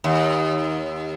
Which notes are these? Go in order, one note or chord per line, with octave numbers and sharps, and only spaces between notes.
D#2